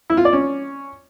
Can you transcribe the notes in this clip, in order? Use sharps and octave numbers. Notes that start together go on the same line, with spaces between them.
E4
F4
D5
C#4